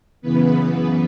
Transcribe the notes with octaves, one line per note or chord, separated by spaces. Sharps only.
F#2 C#3 E3 B3 B4